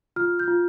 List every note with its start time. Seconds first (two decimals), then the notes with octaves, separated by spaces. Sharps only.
0.16 F4 F6
0.39 G6
0.48 F4